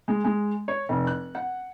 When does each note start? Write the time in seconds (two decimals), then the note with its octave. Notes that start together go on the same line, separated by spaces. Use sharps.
0.08 G#3
0.24 G#3
0.68 C#5
0.89 F1
1.07 F#6
1.35 F#5